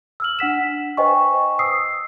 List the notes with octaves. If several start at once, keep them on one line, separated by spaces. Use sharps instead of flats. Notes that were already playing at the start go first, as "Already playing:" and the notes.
E6 F6 F#7
D4 F#5 B6 E7
B4 C5 D#5 G5 G#5 C#6
D#6 E6 C7